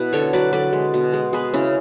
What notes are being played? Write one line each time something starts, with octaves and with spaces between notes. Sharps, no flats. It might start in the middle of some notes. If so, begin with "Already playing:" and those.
Already playing: B2 E4 B4
D3 A4 C#5
F#3 B4 D5
D3 B4 D5
G#3
B2
G#3
B3 G#4 B4
C#3 C#4 E4